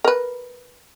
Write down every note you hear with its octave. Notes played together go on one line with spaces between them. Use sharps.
A#4 B4